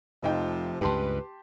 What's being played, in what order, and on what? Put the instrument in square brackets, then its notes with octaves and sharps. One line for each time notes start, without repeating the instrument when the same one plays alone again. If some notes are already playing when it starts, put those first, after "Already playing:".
[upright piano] F1 D#4 G5 [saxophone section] C3 F3
[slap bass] C#2 G2 [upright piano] G4 A5 C6 [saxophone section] B4